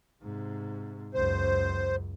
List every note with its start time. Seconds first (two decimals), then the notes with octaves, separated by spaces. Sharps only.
0.23 G#2 C3
1.14 C#2 F#2 C5